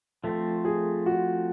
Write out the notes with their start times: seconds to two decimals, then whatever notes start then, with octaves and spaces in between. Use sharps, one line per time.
0.23 F3 A3 C4 A4
0.65 G#4
1.06 F#4